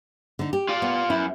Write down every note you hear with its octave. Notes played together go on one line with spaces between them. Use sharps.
D3 D#4
G4
F4 D5
B3
F#2 E4